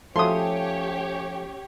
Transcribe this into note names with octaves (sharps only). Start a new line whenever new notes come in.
F3 A3 C#4 G4 C#5 C6 D#6